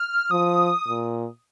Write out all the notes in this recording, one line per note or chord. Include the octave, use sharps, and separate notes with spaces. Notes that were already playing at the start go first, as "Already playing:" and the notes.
Already playing: F6
F3 D#6
A#2